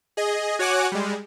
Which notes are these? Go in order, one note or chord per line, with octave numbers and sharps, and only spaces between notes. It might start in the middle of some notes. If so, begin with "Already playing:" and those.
G#4 D#5
F#4 C#5 F#5 G#5 D6 F#6
G3 G#3